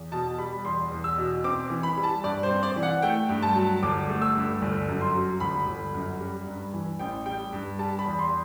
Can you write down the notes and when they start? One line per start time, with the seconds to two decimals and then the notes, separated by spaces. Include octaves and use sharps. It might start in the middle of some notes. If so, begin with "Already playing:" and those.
Already playing: E2
0.12 B2 A5
0.38 G3 B5
0.65 E2 C6
0.92 E2
1.04 E6
1.18 B2
1.44 C4 D6
1.70 E3
1.83 B5
1.97 G3
2.03 A5
2.24 G2 D5
2.43 C5
2.50 C4
2.63 D5
2.76 E3
2.83 F#5
3.02 A3 G5
3.29 G2
3.42 A5
3.55 F#3
3.83 G1 D6
4.09 A3
4.22 E6
4.35 G2
4.62 G1
4.88 F#2
5.01 C6
5.14 F#3
5.40 G1 B5
5.67 G1
5.94 F#2
6.20 G3
6.47 G2
6.73 E3
6.99 A1 G5
7.26 G3 G5
7.53 G2
7.79 G3 A5
7.99 B5
8.05 E2
8.19 C6